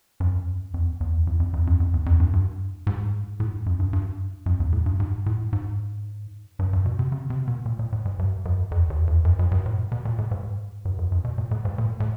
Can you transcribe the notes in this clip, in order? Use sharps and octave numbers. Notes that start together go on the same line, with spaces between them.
F#2
F2
F#2
F2
E2
F2
F2
F2
F#2
F2
E2
F2
G2
G2
G#2
A2
G#2
G2
F#2
G2
G2
F#2
E2
A2
G2
G#2
A2
G#2
G2
G2
B2
C3
C#3
C3
B2
A#2
A#2
A2
G#2
G2
F#2
F2
E2
F2
F#2
F#2
G2
A2
A#2
B2
A#2
A2
G#2
G2
F#2
F#2
B2
A#2
A2
G#2
A#2
A2
A2